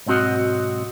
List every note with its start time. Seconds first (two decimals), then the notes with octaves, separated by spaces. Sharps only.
0.06 B1 G#2 C4 F#4 D#5